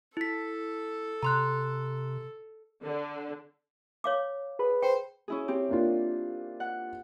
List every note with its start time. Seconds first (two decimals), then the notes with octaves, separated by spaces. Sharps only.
0.17 E4 A4 B6
1.23 C3 A#5 C6 F#6
2.83 D3
4.04 C#5 F5 D6
4.59 G#4 B4 B5
4.83 C5 G5
5.28 C#4 E4 G#4
5.48 C4 G4
5.69 A#3 D4 F4
6.60 F#5